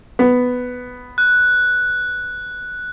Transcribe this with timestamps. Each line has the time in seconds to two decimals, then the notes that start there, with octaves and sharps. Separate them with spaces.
0.19 B3
1.18 F#6